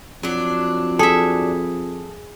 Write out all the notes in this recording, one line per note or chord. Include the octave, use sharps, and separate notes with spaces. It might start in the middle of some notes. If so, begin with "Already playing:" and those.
F2 F#3 D4
G#4 A4 E5